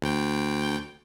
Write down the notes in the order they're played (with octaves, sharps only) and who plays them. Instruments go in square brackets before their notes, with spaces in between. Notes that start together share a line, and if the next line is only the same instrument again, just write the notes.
[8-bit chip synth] D2 G5